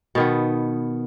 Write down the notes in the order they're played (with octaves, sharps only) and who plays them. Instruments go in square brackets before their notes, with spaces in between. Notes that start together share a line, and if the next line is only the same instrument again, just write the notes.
[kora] B2 D#3 B3